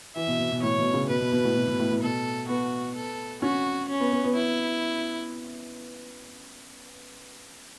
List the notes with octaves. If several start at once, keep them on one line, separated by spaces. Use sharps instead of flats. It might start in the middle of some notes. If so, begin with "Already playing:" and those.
E3 E5
B2
B2
B2
A2 C#5
B2
C#3
B2 B4
B2
B2
A2
B2
B2
A2
A2
B2 A4
B3 F#4
A4
C#4 F#4
C#4
B3
B3
B3
E4